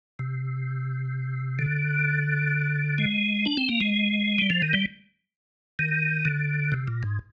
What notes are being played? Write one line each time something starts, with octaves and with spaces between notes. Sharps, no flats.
C3
D3
G#3
D4
C4
A#3
G#3
G3
F3
D#3
G3
D#3
D3
C3
A#2
G#2